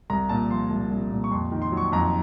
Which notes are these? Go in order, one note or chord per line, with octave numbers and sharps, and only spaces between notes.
C2 A#5
A#2 A5
F3 C6
C2
C2
A#2
C#6
F2 C6
D#3
C6
F#3
C#6
F2 A#5